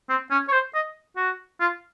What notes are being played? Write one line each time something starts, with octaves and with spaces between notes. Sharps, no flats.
C4
C#4
C#5
C5
D#5
F#4
F4